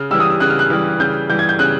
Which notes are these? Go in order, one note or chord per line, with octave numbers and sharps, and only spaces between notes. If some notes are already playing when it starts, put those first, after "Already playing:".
Already playing: C#3 F6
E3 G3 E6
D#6
E6
C#3 F#6
F6
F#6
E3 G3 F6
C#3 G6
E3 G3 G6
G#6
G6
C#3 F#6